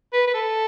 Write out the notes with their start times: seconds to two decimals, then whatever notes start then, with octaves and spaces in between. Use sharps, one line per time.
0.13 B4
0.27 B4
0.34 A4